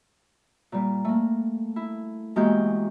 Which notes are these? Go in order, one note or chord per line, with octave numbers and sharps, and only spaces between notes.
A#2 G3
A3 A#3
E4
E2 G#3 A#3 F#4 G4 G6